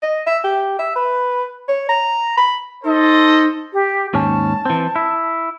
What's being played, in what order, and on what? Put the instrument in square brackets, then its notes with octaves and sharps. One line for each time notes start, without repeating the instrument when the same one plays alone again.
[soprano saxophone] D#5
E5
G4
E5
B4
C#5
A#5
B5
[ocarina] D#4 [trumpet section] A4 C5 D#5
[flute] G4
[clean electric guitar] D#2 G#2 C#4 [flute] A5
[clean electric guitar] E3 C4
E4